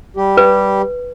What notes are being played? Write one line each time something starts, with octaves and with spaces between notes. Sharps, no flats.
G3 G4
B4